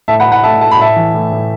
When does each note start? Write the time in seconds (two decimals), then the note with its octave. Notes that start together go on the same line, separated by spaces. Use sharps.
0.08 A2 E5 A5
0.20 F#5 B5
0.26 A3
0.32 F#5 B5
0.43 A3 E5 A5
0.61 A3 A5
0.71 B5
0.79 A2 E5 A5
0.96 E3
1.14 A2
1.32 A2